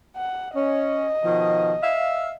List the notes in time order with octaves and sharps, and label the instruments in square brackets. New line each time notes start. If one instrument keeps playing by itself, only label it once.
[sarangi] F#5
[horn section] C#4 [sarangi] D#5
[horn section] B2 D#3 F3
E5 F5